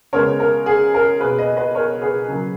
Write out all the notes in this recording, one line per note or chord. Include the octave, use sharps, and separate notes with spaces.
C#3 G#3 B3 A#4 C#5
A#4
G#4
A#4
B2 A#3 G#4 B4
B4 D#5
B4 D#5
A#4 C#5
G#4 B4
C#3 F#3 A#3